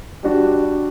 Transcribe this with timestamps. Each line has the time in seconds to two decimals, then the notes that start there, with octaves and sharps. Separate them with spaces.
0.23 G3 D4 F#4